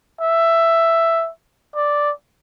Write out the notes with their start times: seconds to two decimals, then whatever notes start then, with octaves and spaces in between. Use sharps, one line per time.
0.21 E5
1.75 D5